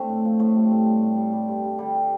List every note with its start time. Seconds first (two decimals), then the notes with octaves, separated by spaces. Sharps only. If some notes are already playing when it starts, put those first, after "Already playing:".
Already playing: A3 C4 D4
0.09 A2
0.25 F3
0.39 A2 A3
0.56 G3
0.71 A2
0.86 G3
1.02 A2
1.17 G3
1.33 G3
1.48 G2
1.64 G2
1.79 D3 G3
1.95 G3